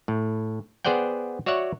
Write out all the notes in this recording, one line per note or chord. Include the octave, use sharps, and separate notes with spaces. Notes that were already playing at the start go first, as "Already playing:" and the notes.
A2
B3 G#4 C5 D5 F#5 G5
F#4 C#5 D5 E5 F#5